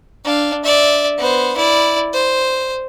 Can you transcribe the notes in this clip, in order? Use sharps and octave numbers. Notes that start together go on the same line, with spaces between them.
D4 F5
D5 E5
B3 C5
E4 D5
C5